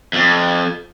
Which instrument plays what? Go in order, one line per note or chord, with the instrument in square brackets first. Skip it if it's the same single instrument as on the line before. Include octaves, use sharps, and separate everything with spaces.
[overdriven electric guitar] F2